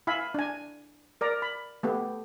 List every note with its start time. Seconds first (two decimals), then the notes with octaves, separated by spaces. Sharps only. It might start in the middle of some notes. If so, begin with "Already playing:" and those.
0.07 E4 E5 F5 G#5 B5
0.34 D4 G#5
1.21 A#4 D5 A#5
1.42 B5
1.83 A3 B3 G4